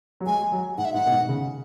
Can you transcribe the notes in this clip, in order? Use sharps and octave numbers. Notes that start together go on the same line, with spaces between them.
F#3
G#3 G#5
F#3
G#2 F#5
E5
G#2 F#5
B2
G#2
C#3